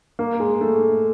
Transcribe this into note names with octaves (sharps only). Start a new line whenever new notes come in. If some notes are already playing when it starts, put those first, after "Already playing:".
A#3
G#3
A3